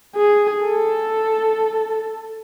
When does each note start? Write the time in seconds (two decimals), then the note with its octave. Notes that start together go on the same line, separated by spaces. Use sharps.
0.16 G#4
0.64 A4